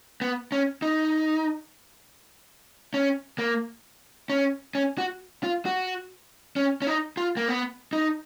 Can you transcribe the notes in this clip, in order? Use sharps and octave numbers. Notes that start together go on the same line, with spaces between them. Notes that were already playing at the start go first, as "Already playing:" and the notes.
B3
C#4
D#4
C#4
A#3
C#4
C#4
F#4
F4
F#4
C#4
C#4
D#4
F4
A#3
B3
D#4